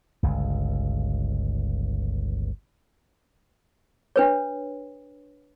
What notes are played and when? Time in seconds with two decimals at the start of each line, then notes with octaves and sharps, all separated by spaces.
0.23 G1 C#2
4.16 D4 B4 C#5